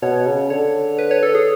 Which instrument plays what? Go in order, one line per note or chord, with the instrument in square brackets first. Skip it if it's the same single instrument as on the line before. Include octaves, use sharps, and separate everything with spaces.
[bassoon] B2 [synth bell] C#5
[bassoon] C#3
[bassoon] D3 [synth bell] C#5
[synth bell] B4
C#5
A4
G#4